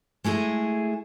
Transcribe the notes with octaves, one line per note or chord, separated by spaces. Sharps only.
G#3 A3 E4 G#4